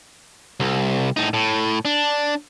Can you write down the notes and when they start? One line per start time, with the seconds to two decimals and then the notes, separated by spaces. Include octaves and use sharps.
0.60 C2
1.17 A2 D#4
1.34 A2
1.85 D4